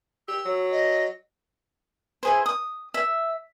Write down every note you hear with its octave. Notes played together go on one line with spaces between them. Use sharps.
G4 E6
F#3
D#5
E4 G#4 C5
D#6
E5